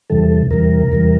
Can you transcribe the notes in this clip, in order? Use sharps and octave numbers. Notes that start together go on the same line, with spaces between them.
E2 C3 E3 G3 A4
A4
E2 C3 E3 G3 A#4
E2 C3 E3 G3